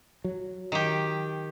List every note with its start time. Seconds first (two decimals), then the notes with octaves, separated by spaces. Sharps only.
0.24 F#3
0.72 D#3 G4